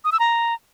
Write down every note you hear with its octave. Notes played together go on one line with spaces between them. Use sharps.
D#6
E6
A#5